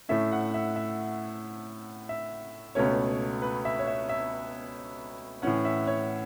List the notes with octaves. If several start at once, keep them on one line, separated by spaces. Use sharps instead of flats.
A2 A3 C#4 E5
F#5
E5
E5
E5
C#2 B2 A3 C#4 C#5
B4
E5
C#5
E5
E5
A2 E3 C#4 F#5
E5
C#5